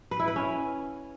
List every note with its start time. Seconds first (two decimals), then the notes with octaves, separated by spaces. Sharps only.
0.11 B4
0.20 E4
0.28 B4
0.36 C#4